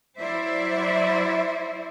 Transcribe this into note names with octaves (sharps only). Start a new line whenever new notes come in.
F#3 E4 C5 D5 E5